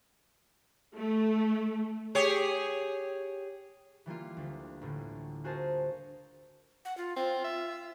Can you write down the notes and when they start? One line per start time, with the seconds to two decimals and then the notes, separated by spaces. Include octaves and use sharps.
0.96 A3
2.15 G4 G#4 C#5
4.06 E3 G3 A#3 F4
4.37 D2
4.81 A1 A2 D3
5.44 F4 F#4 G#4 A#4 C5 A5
6.85 F#5
6.98 F4
7.16 C4 F4
7.45 E5